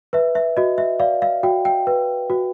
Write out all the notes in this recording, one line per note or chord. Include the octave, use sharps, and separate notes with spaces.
B4 E5
E5
F#4 D#5
E5
D5 F5
F5
F#4 G5
G5
B4
F#4